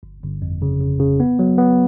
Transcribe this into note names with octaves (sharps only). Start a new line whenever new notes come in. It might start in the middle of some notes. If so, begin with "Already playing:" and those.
G1
G1
F2
C#3
C#3
C#3
B3
F#3
B3